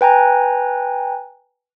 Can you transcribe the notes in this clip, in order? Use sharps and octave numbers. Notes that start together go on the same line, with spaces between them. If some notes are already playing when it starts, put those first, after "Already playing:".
B4 G5 G#5 A#5